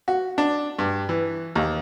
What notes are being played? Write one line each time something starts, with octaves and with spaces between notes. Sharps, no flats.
F#4
D4
G2
E3
D#2